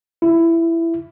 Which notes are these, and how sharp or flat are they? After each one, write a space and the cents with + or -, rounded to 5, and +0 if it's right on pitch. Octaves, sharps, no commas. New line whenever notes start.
E4 +15